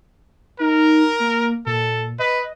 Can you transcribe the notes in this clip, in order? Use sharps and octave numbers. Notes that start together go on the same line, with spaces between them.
D#4 A#4
A#3
A#2 A4
B4 D#5